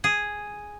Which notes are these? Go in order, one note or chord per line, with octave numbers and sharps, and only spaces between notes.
G#4